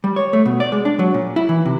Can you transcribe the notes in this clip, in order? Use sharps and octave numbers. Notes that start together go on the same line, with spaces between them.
G3
C#5
A3
B2
D5
G#3
D4
F#3
A#2
E4
E3
C3